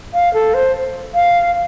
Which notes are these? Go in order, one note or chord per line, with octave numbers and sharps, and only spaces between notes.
F5
A4
C5
F5